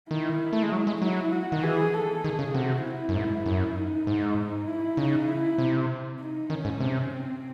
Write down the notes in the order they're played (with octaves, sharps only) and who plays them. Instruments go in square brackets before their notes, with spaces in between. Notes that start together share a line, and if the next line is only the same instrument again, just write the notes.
[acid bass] D#3 [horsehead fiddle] E4
[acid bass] A3
G#3
F#3
G#3
[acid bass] F#3 [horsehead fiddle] E4
[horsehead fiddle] F#4
[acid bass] D#3
[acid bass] E3 [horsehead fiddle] G#4
[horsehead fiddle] A4
[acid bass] D#3 [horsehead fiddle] G#4
[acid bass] C#3
[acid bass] C3 [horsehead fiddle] F#4
[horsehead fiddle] E4
[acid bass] F#2
G#2
F#2
[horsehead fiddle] D#4
[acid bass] G#2
[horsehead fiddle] E4
[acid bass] C#3 [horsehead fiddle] D#4
[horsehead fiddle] E4
[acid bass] C3
[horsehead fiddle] D#4
[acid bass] D#3 [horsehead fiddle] C#4
[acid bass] G#2
C3
[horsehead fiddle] C4